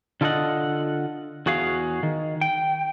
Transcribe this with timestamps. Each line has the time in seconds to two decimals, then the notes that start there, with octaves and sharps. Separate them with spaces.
0.21 D3 F4 A4 A#4 D#5 F#5
1.46 E2 F#4 G#4 F5
2.03 D#3
2.41 G5